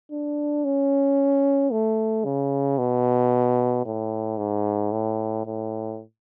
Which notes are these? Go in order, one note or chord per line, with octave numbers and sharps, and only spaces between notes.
D4
C#4
A3
C#3
B2
A2
G#2
A2
A2